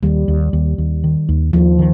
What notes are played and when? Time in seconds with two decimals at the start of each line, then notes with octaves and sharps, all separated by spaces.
0.03 D#2 G3
0.28 D#2
0.53 D#2
0.78 D#2
1.04 D#3
1.29 D#2
1.53 D#2 F3
1.79 D#3